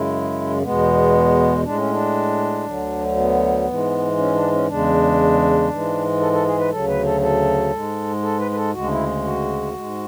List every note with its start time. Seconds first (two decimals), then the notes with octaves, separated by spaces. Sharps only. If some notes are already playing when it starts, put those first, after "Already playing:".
Already playing: F#2 C#3 G#3 E4
0.62 E2 B2 G#3 B3
1.64 A2 G#3 D4
1.77 C#4
1.90 D4
2.65 D2 D3 F#3
3.16 B3
3.66 G#2 E3 G#3
4.17 C#4
4.34 D4
4.51 C#4
4.68 E2 C#3 G#3 D4
5.69 G#2 E3 G#3
6.20 A4
6.32 A4
6.45 G#4
6.58 B4
6.70 D2 C#3 F#3 A4
6.87 B4
7.04 A4
7.21 A4
7.71 G#2 G#3
8.22 A4
8.39 B4
8.51 B4
8.56 A4
8.72 D2 C#3 G#3 F#4
8.84 D4
8.90 E4
9.23 F#4
9.73 G#2 G#3